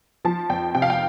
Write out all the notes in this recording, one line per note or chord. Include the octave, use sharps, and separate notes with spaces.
F3 A5
F2 G5
C3 G5
F5
G5